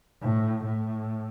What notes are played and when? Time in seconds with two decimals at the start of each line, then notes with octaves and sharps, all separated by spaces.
0.21 A2
0.65 A2